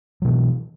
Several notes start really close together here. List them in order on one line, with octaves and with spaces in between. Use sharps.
F#3 B2 E3